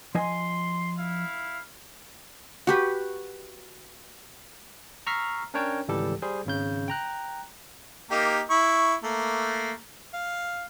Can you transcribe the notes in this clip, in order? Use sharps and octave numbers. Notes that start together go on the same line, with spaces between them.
F3 D#5 G#5 C6
E4 F5
F#4 G4 B4
A#5 C#6 E6 F6 B6 C7
C#4 D4 A#4 C#5 G5 A5
G#1 C#2 E3 G3 G4 A4
G3 G#4 C5
G#1 C#3 G6
G5 A#5 F#6
A#3 D#4 G4
E4 C#6
A3 A#3
F5